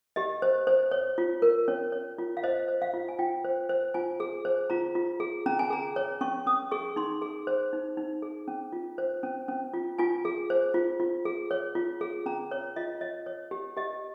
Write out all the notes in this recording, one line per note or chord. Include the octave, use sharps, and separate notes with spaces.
G4 D#5
C5
C5
C#5
F4
A#4
C#4 C#5
C#5
F4
F5
C5 D#5
C5
F5
F4
G#5
F4 G5
C5
C5
F4 G#5
G#4
C5
F4 A#5
F4
G#4
C#4 A#5
G#5
G#4 A#5
C#5
C#4 C#6
C#4 D#6
G#4 C#6
D#4 C6
G#4
C5
D#4
D#4
G#4
C#4
F4
C5
C#4
C#4
F4
F4 G#5
G#4
C5
F4
F4
G#4
C#5
F4
G#4
C#4 A#5
C#5
F4 D#5
C#5 D#5
C#5
G4
G4 D#5